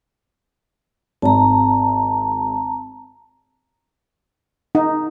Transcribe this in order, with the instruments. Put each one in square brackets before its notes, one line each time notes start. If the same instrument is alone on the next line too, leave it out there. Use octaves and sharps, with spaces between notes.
[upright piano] G#1 [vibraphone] A5 A#5
[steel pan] D#4